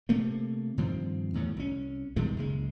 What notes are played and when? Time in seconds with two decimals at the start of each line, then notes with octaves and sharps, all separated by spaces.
0.09 C3 A3 A#3
0.78 G2 D#3 F3 C4
1.34 E2 A2 D#3 F#3
1.57 C2 C#4
2.16 B2 D#3 G3 G#3
2.37 F#1 C#2 G#3